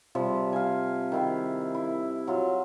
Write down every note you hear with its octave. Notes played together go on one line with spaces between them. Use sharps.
C3 F3 G3
F5 G#5
D#3 E4 F5
E4
F#3 F4